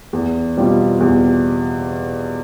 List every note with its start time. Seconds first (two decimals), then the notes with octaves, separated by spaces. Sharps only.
0.13 E2
0.57 B2 G3 C4 F4
1.00 E2